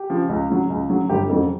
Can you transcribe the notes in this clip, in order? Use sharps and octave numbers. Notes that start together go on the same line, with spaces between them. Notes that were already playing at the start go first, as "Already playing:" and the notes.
Already playing: G4
C#3 F3
C#2
C#3 F#3
C#2
C#3 F#3
G1 G4
F2 C#3 F#3